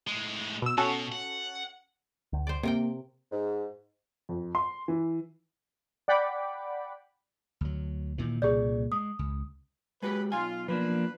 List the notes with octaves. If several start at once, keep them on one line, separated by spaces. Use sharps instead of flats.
A2 G#3
B2 E6
B2 C#4 F#4 A4
F#5
D2
C5 D5
C3 A#3 A#4 G5
G#2
F2
C6
E3
D5 F#5 G5 B5 D6
D2 F#3
A#2 D#3 E3
C2 A#2 C#3 G#4 D5
G#3 D#6
C#2
G#3 F#4 G4 B4
B1 F4 G#5
F3 A#3 D4 B4